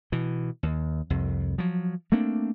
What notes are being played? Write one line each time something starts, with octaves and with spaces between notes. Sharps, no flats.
B2 E3
D#2
C2 F2
F3 F#3
A3 A#3 C4 D4